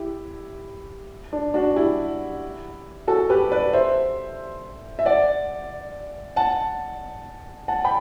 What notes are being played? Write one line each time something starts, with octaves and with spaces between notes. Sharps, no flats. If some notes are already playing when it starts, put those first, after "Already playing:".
Already playing: E4 G4
D4
D4 F#4
E4 G4
F#4 A4
G4 B4
B4 D5
C5 E5
E5
D5 F#5
F#5 A5
F#5 A5
G5 B5